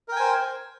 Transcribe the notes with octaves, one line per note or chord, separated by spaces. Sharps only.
A#4 C5 G5 G#5